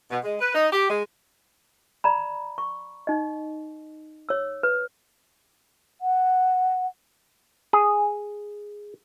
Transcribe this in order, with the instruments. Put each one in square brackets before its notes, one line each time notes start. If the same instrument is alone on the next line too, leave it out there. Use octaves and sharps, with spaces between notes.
[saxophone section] B2
G#3
B4
D#4
G4
G#3
[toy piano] D5 A#5 B5
C#6
D#4 D#5
C#5 E6
B4
[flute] F#5
[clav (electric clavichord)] G#4